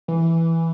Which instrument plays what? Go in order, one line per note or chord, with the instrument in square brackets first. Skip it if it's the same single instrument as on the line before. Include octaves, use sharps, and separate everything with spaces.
[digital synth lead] E3